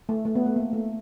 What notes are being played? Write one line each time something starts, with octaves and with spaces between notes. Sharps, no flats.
A3
A3
B3
A3
A#3
A3